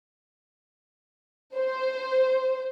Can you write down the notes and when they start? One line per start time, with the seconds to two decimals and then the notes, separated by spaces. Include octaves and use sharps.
1.56 C5